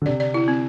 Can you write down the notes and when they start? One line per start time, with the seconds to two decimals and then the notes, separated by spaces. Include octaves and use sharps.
0.02 D3
0.06 C3 D5
0.20 D5
0.34 E4
0.48 C4